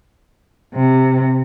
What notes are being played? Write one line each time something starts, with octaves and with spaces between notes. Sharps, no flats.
C3